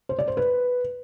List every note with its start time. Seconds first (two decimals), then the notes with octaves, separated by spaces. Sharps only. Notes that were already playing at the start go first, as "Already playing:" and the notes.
0.09 C5
0.19 D5
0.28 C5
0.37 B4